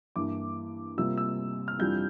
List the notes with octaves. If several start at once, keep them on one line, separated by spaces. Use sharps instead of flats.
G2 E3 A#3 E4 D6
C3 G3 A#3 F4 E6
E6
F6
F2 E3 G3 D4 F4 G6